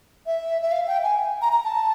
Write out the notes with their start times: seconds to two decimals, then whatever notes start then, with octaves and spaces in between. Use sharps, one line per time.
0.26 E5
0.62 E5
0.72 F5
0.87 G5
1.04 G#5
1.42 A#5
1.53 A#5
1.65 A5